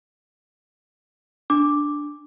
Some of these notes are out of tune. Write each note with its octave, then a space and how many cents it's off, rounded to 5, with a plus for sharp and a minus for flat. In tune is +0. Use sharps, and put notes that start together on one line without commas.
D4 +0 D6 +0